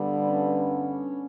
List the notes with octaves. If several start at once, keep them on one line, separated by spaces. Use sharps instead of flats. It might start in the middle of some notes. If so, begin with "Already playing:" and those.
Already playing: G2 D3 G3 B3
C#4